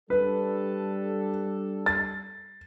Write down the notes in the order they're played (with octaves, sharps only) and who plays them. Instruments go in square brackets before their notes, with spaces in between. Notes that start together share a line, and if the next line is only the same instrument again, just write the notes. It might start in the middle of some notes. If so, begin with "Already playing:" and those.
[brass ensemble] G3 D4 A4 [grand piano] B4
[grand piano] A6